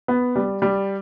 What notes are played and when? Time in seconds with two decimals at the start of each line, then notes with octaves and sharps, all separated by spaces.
0.08 B3
0.36 G3
0.62 G3